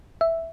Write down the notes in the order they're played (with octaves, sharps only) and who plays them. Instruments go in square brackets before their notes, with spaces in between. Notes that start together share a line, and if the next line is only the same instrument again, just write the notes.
[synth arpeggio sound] E5